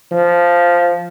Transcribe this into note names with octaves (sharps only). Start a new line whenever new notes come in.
F3